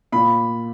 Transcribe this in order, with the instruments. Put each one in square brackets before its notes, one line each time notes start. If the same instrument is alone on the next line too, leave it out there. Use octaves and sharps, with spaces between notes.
[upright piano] A#2 B5